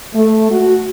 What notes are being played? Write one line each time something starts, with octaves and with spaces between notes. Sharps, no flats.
A3
F#4